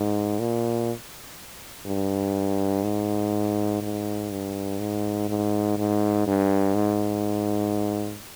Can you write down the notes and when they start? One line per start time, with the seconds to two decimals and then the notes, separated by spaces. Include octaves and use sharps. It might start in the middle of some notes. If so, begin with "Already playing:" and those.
Already playing: G#2
0.40 A#2
1.86 G2
2.83 G#2
3.82 G#2
4.31 G2
4.79 G#2
5.29 G#2
5.78 G#2
6.27 G2
6.75 G#2